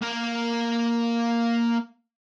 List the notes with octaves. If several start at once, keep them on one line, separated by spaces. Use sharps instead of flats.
A#3 A#4